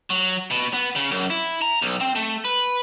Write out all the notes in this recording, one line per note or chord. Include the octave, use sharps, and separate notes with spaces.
F#3
B2
B3
C#3
F#2
E4
A#5
B1
C4
A3
B4